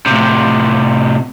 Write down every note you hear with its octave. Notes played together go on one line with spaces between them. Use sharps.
A2 C3